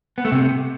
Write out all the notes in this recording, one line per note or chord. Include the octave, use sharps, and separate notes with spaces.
B3
A3
C3